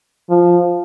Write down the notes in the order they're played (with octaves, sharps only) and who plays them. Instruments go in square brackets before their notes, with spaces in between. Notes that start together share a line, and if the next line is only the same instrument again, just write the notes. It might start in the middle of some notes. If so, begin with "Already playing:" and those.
[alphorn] F3